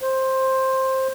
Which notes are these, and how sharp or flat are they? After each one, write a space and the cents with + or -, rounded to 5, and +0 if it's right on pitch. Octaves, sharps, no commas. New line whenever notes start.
C5 +10